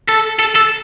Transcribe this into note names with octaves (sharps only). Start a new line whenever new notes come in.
A4
A4
A4